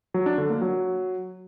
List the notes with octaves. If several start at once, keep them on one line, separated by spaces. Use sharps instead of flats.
F#3
D4
D3
A#3
F#3